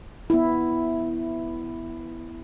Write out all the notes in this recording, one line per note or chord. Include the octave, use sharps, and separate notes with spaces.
B3 E4